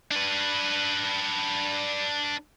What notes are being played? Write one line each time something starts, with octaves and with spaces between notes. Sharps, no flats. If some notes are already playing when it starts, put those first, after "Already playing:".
D4 B4